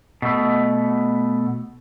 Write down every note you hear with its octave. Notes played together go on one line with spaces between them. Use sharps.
B2 A3